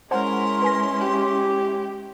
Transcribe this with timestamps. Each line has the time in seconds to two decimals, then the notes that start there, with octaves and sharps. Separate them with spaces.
0.11 G#3 C#4 E4 A#4 C5 F#5 G#5 C6
0.62 B4 G#5 A#6
1.00 G4